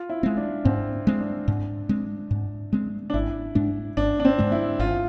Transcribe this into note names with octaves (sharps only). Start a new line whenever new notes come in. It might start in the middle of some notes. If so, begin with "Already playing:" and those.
Already playing: F4
E4
G#3 C4
D4
G#2 C4
G#3 C4
D4
G#2
G#3 C4
G#2
G#3 C4
D4
G#1 E4
G#2 G#3 D4
G#1 D4
D4
C4
G#2 G#3 D4
E4
G#1 F4